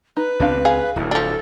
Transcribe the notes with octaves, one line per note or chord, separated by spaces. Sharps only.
D#4 B4
C#2 B3 C4 D4 F5
G#4 F5
D1 D2 E4
F3 D4 A4